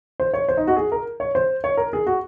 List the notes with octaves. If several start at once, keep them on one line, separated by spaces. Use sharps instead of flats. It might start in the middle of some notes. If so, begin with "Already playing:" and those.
C5
C#5
C5
D#4
F#4
G#4
A#4
C#5
C5
C#5
A#4
G#4
F#4